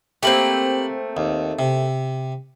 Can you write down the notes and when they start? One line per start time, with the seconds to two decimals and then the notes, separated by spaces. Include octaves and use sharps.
0.23 A3 A#3 C4 G4 B5
1.17 D#2
1.59 C3